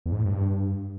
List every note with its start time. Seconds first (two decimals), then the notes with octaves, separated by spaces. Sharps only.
0.06 E2
0.12 G#2
0.19 A2
0.25 G2